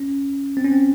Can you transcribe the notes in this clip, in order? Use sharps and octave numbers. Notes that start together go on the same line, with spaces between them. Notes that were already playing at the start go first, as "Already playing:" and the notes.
Already playing: C#4
C4
C#4
C4